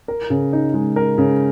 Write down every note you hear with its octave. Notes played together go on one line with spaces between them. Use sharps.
A#4
C#3
D#4
G#3
A#4
C#3